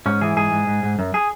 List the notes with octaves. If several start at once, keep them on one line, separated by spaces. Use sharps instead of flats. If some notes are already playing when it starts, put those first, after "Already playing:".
G#2 C#4
E3 G#4
G#2 G#4
G#2
G#2
G#2
F#2
G#4